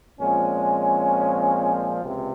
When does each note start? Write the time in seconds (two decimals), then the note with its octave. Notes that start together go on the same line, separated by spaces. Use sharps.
0.20 A#2 F3 G#3 C4 C#4
2.03 C#2 C3